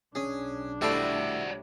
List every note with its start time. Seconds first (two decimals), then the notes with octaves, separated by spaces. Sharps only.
0.15 B1 C#4 D4 G#4
0.81 G3 A3 E4 F#4 C5 D5 G5 A5